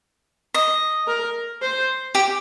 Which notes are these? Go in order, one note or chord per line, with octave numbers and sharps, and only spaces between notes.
D#5
A#4
C5
G4